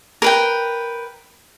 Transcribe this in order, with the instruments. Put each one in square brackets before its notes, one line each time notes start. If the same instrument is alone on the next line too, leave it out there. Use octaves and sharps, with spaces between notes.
[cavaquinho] A#4 B4 G5